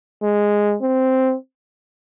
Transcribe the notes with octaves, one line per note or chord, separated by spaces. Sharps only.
G#3
C4